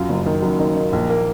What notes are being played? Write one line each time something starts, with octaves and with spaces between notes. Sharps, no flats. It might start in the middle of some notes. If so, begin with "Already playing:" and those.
Already playing: F#2 F4
F#1
D#3
F#2
D#3
D#3
A#1
A#3